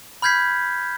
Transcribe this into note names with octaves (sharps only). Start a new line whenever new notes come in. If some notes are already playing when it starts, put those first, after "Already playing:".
B5 F6 G6 G#6 B6 C7